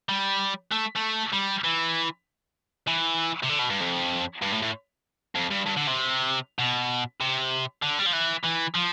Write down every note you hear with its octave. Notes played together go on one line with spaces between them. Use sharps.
G3
A3
A3
G3
E3
E3
C3
D3
B2
G2
F2
G2
A2
A2
F2
G2
G2
D3
C3
B2
C3
D3
G3
F3
E3
E3
F3